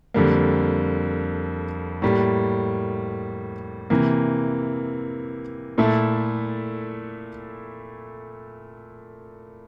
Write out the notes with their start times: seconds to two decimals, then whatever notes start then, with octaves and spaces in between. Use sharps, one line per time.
0.14 F2 D3 G3 A#3
2.02 A2 G3 A#3
3.90 C3 E3 A#3
5.78 A#2 A3 E4 A4